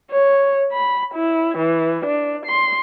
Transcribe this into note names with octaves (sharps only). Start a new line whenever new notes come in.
C#5
B5
E4
E3
D4
C6